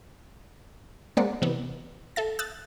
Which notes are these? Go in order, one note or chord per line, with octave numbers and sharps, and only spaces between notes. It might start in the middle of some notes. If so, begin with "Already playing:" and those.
G#3 A#3 C4 A#4 D5 F#5
C3 E3 B3
A4 E5 A6
D#6 E6 F#6 A6